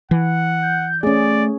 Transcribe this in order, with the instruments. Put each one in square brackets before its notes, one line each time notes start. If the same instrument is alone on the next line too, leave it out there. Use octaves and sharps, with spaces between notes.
[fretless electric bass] E3 [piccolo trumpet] F#5
[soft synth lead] G6
[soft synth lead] A3 [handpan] C#4 G#4 [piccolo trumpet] D5